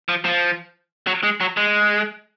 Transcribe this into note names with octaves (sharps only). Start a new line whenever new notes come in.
F3
F3
F#3
G#3
F#3
G#3